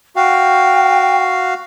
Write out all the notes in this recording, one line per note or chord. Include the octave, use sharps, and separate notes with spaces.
F#4 F5 G5